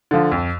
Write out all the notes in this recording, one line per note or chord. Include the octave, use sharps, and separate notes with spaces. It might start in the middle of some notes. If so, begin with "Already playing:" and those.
D3 F3
F2